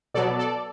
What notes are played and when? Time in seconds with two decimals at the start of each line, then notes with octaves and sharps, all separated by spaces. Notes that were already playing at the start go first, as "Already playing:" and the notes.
0.14 B2 F#3 B3 A4 D5
0.38 A4 D5